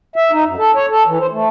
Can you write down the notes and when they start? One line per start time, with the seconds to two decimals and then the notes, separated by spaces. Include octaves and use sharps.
0.16 E5
0.32 D#4
0.45 F#2
0.57 A4
0.75 C#5
0.90 A4
1.06 E3
1.20 C5
1.31 A3